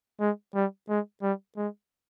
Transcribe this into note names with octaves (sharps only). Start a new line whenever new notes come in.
G#3
G3
G#3
G3
G#3